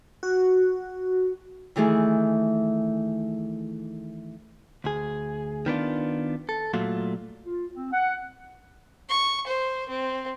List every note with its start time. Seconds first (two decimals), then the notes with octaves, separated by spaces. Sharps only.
0.23 F#4
1.76 D#3 E3 A3 G#4
4.84 D2 G#4
5.66 D#3 B3 D4 F4
6.49 A4
6.74 A#2 F#3 A3 F4
7.45 F4
7.74 C4
7.93 F#5
9.09 C#6
9.47 C5
9.89 C4